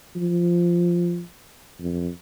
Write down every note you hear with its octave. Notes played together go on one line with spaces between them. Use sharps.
F3
F2